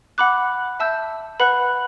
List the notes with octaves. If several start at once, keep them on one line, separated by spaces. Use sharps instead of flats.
F#5 B5 D6 F#6
E5 A5 E6 G6
B4 F#5 B5 F#6